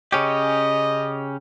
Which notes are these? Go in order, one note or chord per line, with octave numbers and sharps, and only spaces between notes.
C#3 C#4 G4 D#5